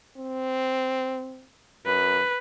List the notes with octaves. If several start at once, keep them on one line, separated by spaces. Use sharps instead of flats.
C4
F#2 B4